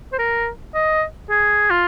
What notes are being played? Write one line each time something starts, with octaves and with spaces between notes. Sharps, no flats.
C5
A#4
D#5
G#4
F4